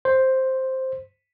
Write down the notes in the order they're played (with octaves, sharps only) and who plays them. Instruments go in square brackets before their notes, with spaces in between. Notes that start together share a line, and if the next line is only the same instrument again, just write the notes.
[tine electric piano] C5